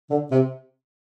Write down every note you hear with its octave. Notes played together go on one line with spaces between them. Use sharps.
D3
C3